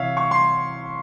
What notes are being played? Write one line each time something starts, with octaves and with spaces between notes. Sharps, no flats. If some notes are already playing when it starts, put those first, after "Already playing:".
Already playing: C3 E3 C#5 E5 F5
C#6
C6